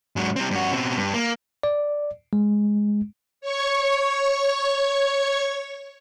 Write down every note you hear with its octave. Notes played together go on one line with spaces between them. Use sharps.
G#2 F#3
G3 C4
G2 F#4
B2 C4
G2
A#3
D5
G#3
C#5 C#6